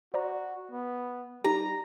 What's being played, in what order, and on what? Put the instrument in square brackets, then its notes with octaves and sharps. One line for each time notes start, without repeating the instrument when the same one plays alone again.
[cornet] F#4 [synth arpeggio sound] C5 D5 A#5
[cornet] B3
[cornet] G3 [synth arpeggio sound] D#4 G4 [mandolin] A#5